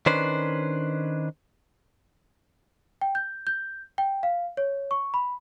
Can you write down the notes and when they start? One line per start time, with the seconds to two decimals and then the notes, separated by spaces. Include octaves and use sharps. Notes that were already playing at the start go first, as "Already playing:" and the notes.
0.06 D#3 C#4 D4 B4 C5
3.02 G5
3.15 G6
3.47 G6
3.98 G5
4.23 F5
4.57 C#5
4.91 C#6
5.14 B5